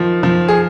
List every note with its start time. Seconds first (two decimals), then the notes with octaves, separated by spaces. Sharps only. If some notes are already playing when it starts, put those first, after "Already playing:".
Already playing: D#3 F3
0.23 F3
0.48 G#4